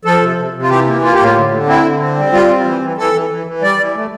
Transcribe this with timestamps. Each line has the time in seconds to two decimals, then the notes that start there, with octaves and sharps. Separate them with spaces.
0.05 F3 A4
0.22 C3
0.37 C3
0.53 C3
0.62 F4
0.69 E3 G4
0.86 A#3
1.02 A#3 F4
1.13 G4
1.18 A2
1.24 F4
1.35 D3
1.51 D3
1.67 C4 E4
1.84 D3
2.00 C4
2.16 G3
2.32 G3 F4
2.48 C4
2.64 E3
2.82 E3
2.97 E3 A4
3.14 E3
3.30 E3
3.47 E3
3.62 G3 D5
3.79 E3
3.95 A3